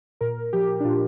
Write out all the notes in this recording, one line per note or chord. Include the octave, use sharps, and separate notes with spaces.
A#2 A#4
F3 G4
D4
A#2 F4